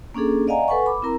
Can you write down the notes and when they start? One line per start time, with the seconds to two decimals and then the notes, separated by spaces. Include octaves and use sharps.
0.14 A#3 C#4 D4 G#4 A4
0.47 D5 D#5 F5 F#5 G#5 A#5
0.68 A4 B4 F#5 G#5 C#6
0.86 B5 D6
1.02 C4 E4 A#4 A#5